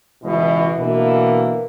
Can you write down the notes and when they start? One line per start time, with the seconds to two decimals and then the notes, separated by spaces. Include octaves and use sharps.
0.23 C#2 B2 E3
0.77 B2 D3 E3 A#3